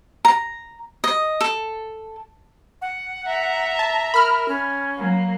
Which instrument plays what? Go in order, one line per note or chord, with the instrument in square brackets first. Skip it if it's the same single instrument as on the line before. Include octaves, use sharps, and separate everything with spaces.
[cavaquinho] A#5
D#5
A4
[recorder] F#5
[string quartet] E5 A#5
[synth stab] A5
[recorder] A#4 [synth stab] B5 F6
[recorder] C#4
[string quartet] F#3 A#3